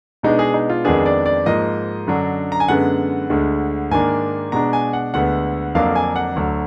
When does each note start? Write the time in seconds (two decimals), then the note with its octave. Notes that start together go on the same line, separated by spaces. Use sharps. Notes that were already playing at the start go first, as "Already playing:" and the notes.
0.23 B2 G#3 B3 D4 D#4
0.39 G#4
0.54 D#4
0.69 F4
0.84 F2 D#3 G#3 B3 D4 G#4
1.06 D5
1.26 D5
1.46 G#2 F3 A#3 D#5
2.07 F#2 D3 F#3 D4
2.52 A#5
2.60 G#5
2.68 F#2 D3 G#3 B3 F#5
3.30 D2 D3 G#3
3.91 G#2 D#3 A#3 D4 G#5
4.52 B2 G#3 D4 A#5
4.73 G#5
4.93 F#5
5.14 D2 D3 G#3 B3 F#5
5.75 F2 D3 F#3 A#3 D4 F5
5.96 G#5
6.16 F#5
6.36 D2 D3 F#3